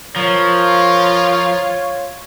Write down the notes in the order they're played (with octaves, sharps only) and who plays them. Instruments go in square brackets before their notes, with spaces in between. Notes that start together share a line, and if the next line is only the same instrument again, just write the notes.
[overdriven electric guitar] F3 [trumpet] F4 [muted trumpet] A#4 [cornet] C#5